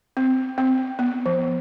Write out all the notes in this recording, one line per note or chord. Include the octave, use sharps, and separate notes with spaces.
C4
C4
B3
F3